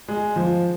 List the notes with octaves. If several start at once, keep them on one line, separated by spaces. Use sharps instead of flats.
G#3
F3